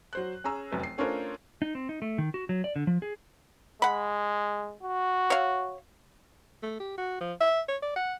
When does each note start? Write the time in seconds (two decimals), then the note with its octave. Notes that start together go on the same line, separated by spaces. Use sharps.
0.13 F#3 C5 F#6
0.44 C#4 G#4 A#5 E6
0.72 F1 F#2 B4
0.83 C7
0.98 A3 C#4 D4 F4 A#4 C5
1.62 D#4
1.75 C4
1.89 D#4
2.02 A3
2.18 D#3
2.34 F#4
2.49 F#3
2.64 D5
2.76 D3
2.87 F3
3.02 G#4
3.82 G#3 F#5 B5
4.83 F#4
5.30 C#5 F5
6.63 A3
6.80 G4
6.98 F#4
7.21 F3
7.40 E5
7.68 C#5
7.82 D5
7.96 F#5